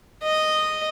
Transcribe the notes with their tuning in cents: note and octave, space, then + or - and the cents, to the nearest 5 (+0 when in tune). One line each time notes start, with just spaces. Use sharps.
D#5 -5